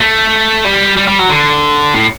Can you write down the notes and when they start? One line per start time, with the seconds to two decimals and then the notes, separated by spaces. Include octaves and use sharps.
0.01 A3
0.64 G3
0.97 G3
1.07 G3
1.19 F#3
1.29 D3
1.94 A2